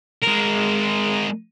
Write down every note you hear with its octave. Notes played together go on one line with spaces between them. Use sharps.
G#3 A#4